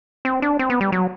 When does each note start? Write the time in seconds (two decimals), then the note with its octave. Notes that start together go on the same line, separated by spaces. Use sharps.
0.25 C4
0.42 D4
0.59 C4
0.70 B3
0.81 G3
0.92 F#3